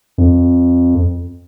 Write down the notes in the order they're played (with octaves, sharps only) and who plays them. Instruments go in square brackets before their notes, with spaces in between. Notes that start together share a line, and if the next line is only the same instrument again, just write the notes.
[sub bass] F2